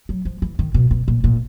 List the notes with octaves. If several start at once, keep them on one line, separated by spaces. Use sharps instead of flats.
F#3
F3
E3
D#3
B2
B2
A#2
A#2